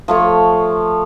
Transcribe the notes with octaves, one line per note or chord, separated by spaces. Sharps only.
F3 A3 C#5